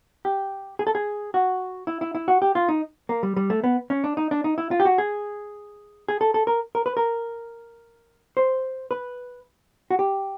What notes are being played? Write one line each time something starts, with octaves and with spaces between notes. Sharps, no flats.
G4
G#4
A4
G#4
F#4
E4
E4
E4
F#4
G4
F4
D#4
A#3
G3
G3
A3
B3
C#4
D4
D#4
D4
D#4
E4
F4
G4
F#4
G#4
G#4
A4
A4
A#4
A#4
B4
A#4
C5
B4
F#4
G4